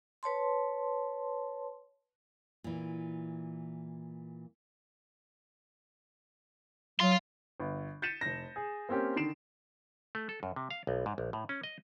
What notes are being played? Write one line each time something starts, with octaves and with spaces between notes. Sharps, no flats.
B4 C#5 A5 C6
A#2 E3
F#3 F5 C6
G1
G6 A6 B6 C#7 D#7 E7
F1 A#6
G#4
A#3 C4 C#4 G4 A#4
D3 D#3 C7 D7 E7
A3
A4
F#2
C3
F5
B1
G#2
A#1
A2
C#4
D#5